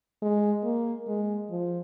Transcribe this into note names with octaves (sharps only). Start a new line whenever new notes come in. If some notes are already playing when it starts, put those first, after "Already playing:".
G#3
A#3
G#3
F3